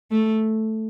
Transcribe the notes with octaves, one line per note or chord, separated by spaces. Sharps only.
A3